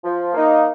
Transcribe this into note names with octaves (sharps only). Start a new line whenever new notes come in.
F3
A#3 D#4